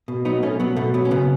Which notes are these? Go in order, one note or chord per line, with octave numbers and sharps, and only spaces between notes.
B2
F#3 B3 D#4
B2 A3 C#4
F#3 B3
B2 A3
F#3 B3
C#4
C#3 B3